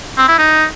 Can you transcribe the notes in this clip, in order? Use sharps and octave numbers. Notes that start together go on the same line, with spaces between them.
C4
E4
D#4